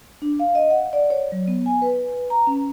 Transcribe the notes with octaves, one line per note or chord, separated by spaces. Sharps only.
D4
F5
D#5
F#5
D5
C#5
F#3
B3
G#5
B4
A#5
C#4